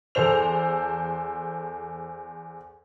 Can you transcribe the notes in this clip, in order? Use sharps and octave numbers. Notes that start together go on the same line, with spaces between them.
E2 A4 C5 F7